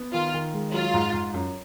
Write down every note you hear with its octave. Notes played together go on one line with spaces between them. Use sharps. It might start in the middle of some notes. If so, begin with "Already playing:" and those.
Already playing: B3
D#3 F4
D#3
G#3
F#3 F4
G#2
G#2
F#2